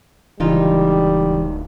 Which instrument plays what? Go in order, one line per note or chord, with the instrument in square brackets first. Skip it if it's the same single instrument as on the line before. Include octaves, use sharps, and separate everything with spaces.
[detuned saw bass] D1 [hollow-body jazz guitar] C#2 E3 [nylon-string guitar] D#3 D#4 F4 [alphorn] G3